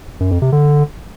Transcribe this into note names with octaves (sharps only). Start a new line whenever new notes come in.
F#2
F2
C3
D3